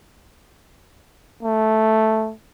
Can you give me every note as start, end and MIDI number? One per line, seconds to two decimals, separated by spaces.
1.43 2.33 57